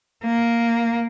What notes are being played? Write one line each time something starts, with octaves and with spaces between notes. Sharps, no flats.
A#3